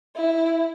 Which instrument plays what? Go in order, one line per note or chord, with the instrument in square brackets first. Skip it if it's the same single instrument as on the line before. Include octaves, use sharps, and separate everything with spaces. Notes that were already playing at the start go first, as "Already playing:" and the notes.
[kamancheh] E4